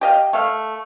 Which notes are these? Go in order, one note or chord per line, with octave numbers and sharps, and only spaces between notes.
G4 D#5 F5
A3 F5